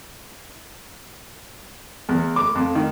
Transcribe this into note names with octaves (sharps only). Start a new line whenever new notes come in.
E2
D6
F2
D#3